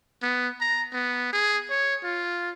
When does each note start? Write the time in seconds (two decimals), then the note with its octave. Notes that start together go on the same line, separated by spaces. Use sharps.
0.23 B3
0.61 A#5
0.93 B3
1.33 G#4
1.70 C#5
2.04 F4